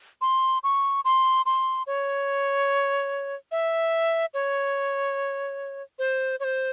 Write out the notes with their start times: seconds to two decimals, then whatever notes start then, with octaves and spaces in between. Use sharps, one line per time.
0.21 C6
0.63 C#6
1.05 C6
1.46 C6
1.87 C#5
3.51 E5
4.34 C#5
5.99 C5
6.40 C#5
6.44 C5